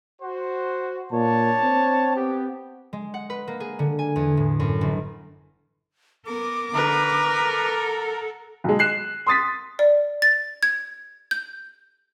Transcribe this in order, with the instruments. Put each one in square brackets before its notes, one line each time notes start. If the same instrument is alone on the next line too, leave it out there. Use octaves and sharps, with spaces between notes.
[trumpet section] F#4 C5
[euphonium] A#2 [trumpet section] D4 C#5 A5
[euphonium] C4
[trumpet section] B3 G4
[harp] G#3
F#5
B4
A#3
G#4
D3
G#5
E2
A2
F#2
G1
[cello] B3 A#4 [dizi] D6
[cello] D3 [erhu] A#4 [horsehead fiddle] B4
[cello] A4 F#5
[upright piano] B1 G#3
F#6 C7 E7
C6 D#6 A6 B6
[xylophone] D5
A6
G#6
G6